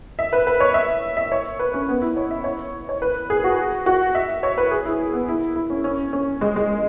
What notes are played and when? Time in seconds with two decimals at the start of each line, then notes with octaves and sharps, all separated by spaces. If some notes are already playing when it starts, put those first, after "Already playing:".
0.19 E5
0.33 B4
0.47 B4
0.60 C#5
0.74 E5
1.17 E5
1.32 C#5
1.59 B4
1.74 C#4
1.88 B3
2.02 E4
2.17 C#5
2.31 E5
2.44 C#5
2.89 C#5
3.02 B4
3.30 G#4
3.44 F#4
3.86 F#4
4.15 E5
4.43 C#5
4.58 B4
4.71 G#4
4.86 E4
5.13 B3
5.28 E4
5.56 E4
5.70 C#4
5.84 C#4
6.13 C#4
6.41 G#3
6.56 G#3